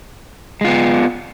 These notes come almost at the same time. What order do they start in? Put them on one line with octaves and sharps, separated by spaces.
G#3 F4 B3